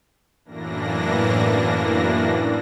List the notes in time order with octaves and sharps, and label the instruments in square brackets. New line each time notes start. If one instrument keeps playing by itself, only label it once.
[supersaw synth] F#2 A2 E3 A#3 D4 A#6